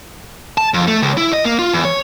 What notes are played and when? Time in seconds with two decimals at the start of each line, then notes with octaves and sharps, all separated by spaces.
0.58 A5
0.74 F2
0.88 A3
1.02 C#2
1.18 E4
1.33 D#5
1.46 A#3
1.59 F4
1.74 E2
1.85 C#5